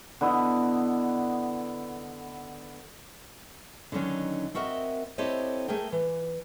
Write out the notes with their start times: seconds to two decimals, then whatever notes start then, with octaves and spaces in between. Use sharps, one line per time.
0.21 D3 B3 E4 D#5
3.92 D3 D#3 F#3 C#4 D#4
4.55 C4 F#4 A#4 D#5 E5
5.18 C4 E4 G4 A4 C#5 D#5
5.68 A3 G#4 A#4 G5
5.92 E3